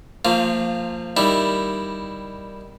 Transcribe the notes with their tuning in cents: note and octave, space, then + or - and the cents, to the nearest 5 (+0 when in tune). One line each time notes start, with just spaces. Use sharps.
F3 +0 A#3 -35 F4 -5
D#3 +0 G3 +0 E4 +0